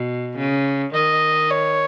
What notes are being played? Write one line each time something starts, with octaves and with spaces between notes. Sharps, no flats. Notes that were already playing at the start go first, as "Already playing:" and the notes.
Already playing: B2
C#3
D#3 D#5
C#5